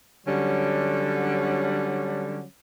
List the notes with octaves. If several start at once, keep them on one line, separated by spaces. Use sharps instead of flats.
D3 F#3 G3 C#4 D4